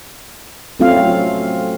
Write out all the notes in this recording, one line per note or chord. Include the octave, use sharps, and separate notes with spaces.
F#3 A3 C4 C#4 F4 F5